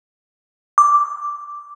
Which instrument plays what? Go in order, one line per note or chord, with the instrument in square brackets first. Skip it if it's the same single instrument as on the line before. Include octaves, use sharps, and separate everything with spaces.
[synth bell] D6